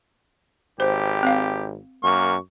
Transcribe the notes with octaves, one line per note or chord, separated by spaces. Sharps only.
G#1 G4 C5
C4 F5
F#2 A#3 C#6